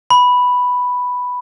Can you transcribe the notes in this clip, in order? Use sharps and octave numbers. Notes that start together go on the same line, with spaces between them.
B5